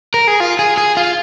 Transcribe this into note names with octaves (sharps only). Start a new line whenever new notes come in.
A#4
G#4
F4
G#4
G#4
F4